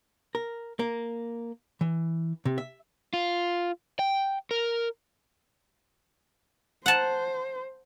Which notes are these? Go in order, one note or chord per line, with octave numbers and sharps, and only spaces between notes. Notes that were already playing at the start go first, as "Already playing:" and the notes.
A#4
A#3
E3
C3
E5
F4
G5
A#4
C5 F#5 A5